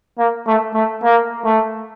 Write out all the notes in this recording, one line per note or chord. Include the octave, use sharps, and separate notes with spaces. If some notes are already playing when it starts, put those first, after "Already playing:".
A#3
A3
A3
A#3
A3